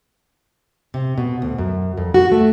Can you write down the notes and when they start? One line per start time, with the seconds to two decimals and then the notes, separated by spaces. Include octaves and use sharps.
0.94 C3
1.18 B2
1.42 D2
1.58 F#2
1.98 F2
2.14 F#4
2.32 A3